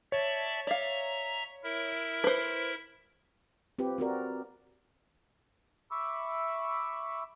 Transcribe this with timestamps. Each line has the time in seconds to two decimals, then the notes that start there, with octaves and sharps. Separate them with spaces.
0.12 C#5 D5 E5 A5
0.67 D5 E5 F5 A#5
1.63 E4 A#4 E5
2.24 B4 C5
3.79 C4 F4 G4 B4
3.98 C4 F#4 A#4 D5
5.91 E5 B5 C#6 D6 E6